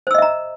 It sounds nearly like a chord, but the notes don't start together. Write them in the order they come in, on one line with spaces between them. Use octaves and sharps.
C5 E6 D#5 E5 A#5